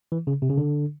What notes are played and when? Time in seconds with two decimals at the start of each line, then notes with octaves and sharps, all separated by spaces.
0.12 E3
0.27 C#3
0.42 C3
0.50 C#3
0.58 D3